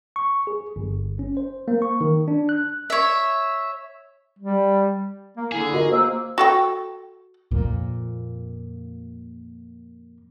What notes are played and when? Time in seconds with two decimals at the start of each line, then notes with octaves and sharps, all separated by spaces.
0.16 C#6
0.47 G#4
0.76 G1
1.19 C#4
1.37 C5
1.68 A#3
1.82 C#6
2.01 D#3
2.28 D4
2.49 F#6
2.90 C#5 E5
4.39 G3
5.37 A#3
5.52 D3 E4 G#4
5.73 F4 F#4 A#4 D#5
5.92 A#3 C5 E6
6.38 F#4 A4 G5
7.51 F2 A#2